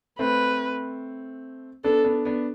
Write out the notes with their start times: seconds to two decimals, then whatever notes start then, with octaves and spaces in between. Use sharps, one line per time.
0.19 A3 C4 B4
1.84 B3 D4 A4
2.04 B3 D4
2.25 B3 D4